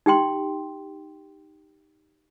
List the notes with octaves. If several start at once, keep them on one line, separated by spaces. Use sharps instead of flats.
D#4 G4 G5 C6